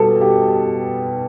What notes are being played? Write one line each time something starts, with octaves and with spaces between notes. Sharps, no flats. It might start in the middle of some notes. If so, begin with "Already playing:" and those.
Already playing: B2 G3 A4
G4